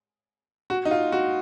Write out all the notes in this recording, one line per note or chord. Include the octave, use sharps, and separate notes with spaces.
F#4
D#4
F4
F#4